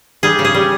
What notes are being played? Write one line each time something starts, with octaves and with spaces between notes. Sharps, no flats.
G3 G#4
C#3
G#4
G3